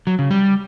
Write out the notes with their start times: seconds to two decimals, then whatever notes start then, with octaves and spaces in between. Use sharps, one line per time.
0.07 F#3
0.19 C#3
0.31 G3